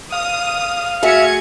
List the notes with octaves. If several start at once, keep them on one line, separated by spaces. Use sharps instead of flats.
F5 D#6
A3 F#4 G#4 E5 G#6 C#7